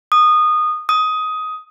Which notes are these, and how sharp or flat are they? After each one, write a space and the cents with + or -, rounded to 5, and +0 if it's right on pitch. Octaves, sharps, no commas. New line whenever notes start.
D#6 -20
D#6 +10